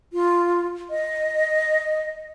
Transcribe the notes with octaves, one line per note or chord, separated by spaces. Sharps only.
F4
D#5